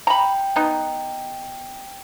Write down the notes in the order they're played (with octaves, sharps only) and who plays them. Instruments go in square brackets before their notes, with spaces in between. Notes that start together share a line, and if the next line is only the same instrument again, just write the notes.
[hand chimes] G5 [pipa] A#5 B5
[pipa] B3 D#4